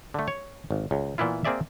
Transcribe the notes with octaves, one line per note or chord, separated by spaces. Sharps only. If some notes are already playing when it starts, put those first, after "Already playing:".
D3 A3
C#5
G#1
C#2
A#2 E3 B3 E4 F4
A#3 C4 G#4 D5 E5